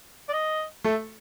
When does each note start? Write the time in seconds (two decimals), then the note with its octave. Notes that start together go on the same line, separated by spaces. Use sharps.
0.29 D5
0.33 D#5
0.84 A3 A4